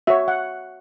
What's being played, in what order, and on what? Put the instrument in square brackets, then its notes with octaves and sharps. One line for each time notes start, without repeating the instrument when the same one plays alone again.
[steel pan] F#4 C#5 E5
F#5